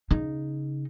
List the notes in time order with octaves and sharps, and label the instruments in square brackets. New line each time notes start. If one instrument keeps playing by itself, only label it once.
[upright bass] C#3 D#4